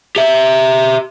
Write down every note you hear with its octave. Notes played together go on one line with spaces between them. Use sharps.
G4 E5